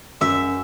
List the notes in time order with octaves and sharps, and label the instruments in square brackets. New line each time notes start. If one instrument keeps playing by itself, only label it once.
[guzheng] F#2 E5